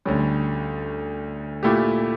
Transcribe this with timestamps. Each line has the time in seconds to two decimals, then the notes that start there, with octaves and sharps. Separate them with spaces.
0.05 D2 D3 G3 C#4
1.63 A#2 A3 E4 G4